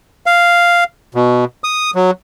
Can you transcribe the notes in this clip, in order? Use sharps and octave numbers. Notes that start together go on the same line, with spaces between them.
F5
B2
D#6
F#3